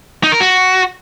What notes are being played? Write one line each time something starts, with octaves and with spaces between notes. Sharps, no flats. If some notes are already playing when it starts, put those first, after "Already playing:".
D#4
A#4
F#4